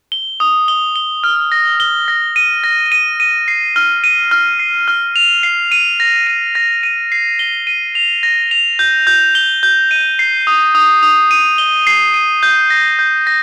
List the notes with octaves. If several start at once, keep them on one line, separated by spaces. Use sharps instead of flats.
G7
D#6
G7
G7
F6
A#6
G7
A#6
D#7
A#6
D#7
D#7
C7
F6
D#7
F6
C7
F6
F7
C7
D#7
A#6
D#7
A#6
D#7
C7
G7
D#7
F7
A#6
F7
G6
G6
G7
G6
D#7
C7
D#6
D#6
D#6
D#7
G7
C7
D#7
G6
A#6
G6
A#6